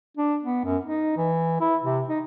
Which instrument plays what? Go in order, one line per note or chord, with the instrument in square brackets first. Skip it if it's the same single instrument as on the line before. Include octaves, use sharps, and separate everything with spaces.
[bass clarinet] D4
B3
F#2
D#4
E3
E4
C3
D#4